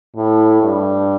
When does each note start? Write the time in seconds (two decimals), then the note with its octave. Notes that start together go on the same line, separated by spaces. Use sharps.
0.16 A2
0.63 G2